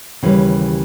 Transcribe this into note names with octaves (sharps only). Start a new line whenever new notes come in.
D#2 C#3 E3 G3